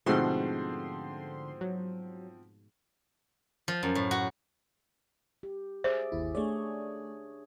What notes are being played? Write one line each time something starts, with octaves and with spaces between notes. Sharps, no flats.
G#2 B2 D3 F3 A3 C4 F#5 C6
F#3
F3
F#2
A2
F#4
G4
G#4 C5 D5 E5
G1 D#2 E4
A3 D4 G#4 C#5 D5